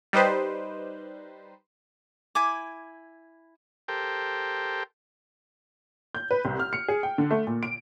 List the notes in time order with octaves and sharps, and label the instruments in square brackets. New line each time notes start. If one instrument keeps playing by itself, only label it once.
[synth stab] G3 D#4 B4 C5
[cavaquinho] E4 G#5 D6
[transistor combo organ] G4 A4 A#4 C5 G5
[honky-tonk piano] G6
B4
C2
F6
C#7
G#4
G5
D3
A3
A#2
D7